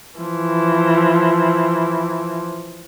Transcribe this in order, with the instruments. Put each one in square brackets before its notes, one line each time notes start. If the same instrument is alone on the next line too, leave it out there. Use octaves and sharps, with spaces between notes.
[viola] E3 F3